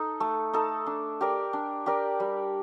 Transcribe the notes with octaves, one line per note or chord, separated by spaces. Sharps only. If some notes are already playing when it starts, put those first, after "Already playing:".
Already playing: D#4 A4
A3
D#4 A4
D4
G4 A#4 D5
D4
G4 A#4 D5
G3